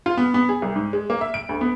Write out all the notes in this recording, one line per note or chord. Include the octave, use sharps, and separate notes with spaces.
F4
B3
B3
G#4
C2
G#2
G#3
A#3
E5
D7
D2
B3